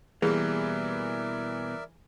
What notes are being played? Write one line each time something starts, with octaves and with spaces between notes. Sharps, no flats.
B2 E3 G3 A#3 G#4 A#4 D5 E5